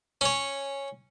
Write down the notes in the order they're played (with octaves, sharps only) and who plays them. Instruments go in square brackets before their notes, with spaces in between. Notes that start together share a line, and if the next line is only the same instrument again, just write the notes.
[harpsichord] C#4 C#5